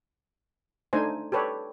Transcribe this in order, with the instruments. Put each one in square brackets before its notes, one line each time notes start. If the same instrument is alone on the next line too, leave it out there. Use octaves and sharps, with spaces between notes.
[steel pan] A3 D4 D#4 C5 G#5
G4 A4 B4 C#5 D5